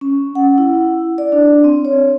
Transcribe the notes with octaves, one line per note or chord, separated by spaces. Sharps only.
C#4
F#5
E4
D5
D4
C4
C#5